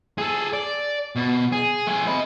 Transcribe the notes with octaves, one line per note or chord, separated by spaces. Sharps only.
G#4 A4
D5
B2
G#4
A3 G#5
D#5 B5